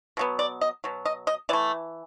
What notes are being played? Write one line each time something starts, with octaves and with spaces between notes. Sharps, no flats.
B2 F#3 B3
D5
D#5
B2 F#3
D#5
D#5
E3 A3 D5